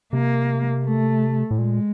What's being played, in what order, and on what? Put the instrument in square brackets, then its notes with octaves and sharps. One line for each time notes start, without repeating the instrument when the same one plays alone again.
[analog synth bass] C3 [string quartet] A#3
[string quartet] A3
[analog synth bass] A2
[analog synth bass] A#2 [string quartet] G#3